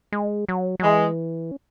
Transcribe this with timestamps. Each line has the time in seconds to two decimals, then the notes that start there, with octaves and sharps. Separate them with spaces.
0.12 G#3
0.48 F#3
0.79 F#3
0.83 E3 G#3
1.51 C#4